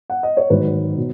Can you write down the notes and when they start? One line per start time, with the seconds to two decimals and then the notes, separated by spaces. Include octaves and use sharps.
0.10 F#5
0.23 D#5
0.37 C#5
0.50 G#2 D#3 F#3 B4
0.97 B2